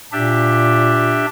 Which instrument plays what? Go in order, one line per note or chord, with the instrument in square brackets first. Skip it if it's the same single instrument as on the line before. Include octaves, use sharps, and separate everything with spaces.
[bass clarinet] A#2 [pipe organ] D4 G4 E5